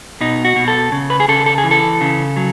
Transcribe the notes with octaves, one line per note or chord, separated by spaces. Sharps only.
B2 D#4
F#4
B2
A4
C#3
B4
G#4
C#3 A4
A4
G#4
E3
A4
C#3
F#3